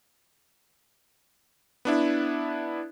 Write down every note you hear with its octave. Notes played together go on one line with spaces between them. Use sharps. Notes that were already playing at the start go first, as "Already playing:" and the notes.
B3 D4 E4